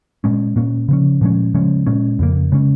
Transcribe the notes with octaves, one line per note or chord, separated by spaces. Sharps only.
A#2 G#3 C#4
A#2 A#3 C#4
C#3 F3 C#4
A#2 F3 G#3 C#4
C#3 F3 G#3 C#4
A#2 G#3 C#4
F2 C#3 A#3
C#3 G#3 C#4